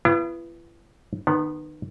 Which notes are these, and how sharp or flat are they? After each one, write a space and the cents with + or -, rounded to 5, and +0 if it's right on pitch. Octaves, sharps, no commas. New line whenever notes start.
B3 +0 E4 +45
D#3 -30 B3 +0